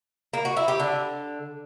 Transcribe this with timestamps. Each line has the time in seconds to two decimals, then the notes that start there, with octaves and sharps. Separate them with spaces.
0.33 A#3
0.45 F#4
0.57 E4
0.68 G4
0.80 D3